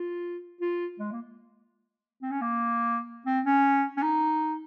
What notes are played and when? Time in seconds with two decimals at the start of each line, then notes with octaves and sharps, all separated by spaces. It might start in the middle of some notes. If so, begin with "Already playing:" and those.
Already playing: F4
0.61 F4
0.99 G#3
1.12 A#3
2.22 C4
2.31 C#4
2.41 A#3
3.26 C4
3.45 C#4
3.97 C#4
4.02 D#4